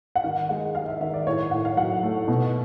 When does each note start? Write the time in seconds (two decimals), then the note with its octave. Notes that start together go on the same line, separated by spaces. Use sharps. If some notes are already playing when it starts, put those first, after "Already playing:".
0.16 F#5
0.24 D#3 F5
0.49 G#3 F#5
0.75 G#3 F5
0.88 E5
1.01 D#3 E5
1.14 D5
1.27 A2 C#5
1.51 A2 F#5
1.65 F5
1.77 F#3 F#5
2.03 A3
2.28 B2